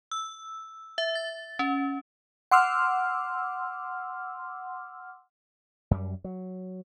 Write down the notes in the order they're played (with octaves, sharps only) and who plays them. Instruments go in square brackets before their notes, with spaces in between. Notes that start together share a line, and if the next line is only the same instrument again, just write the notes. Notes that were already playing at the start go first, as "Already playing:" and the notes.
[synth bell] E6
E5
A6
C#4
[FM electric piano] F#5 C6 D6 E6 F6
[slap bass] F#2 G3
F#3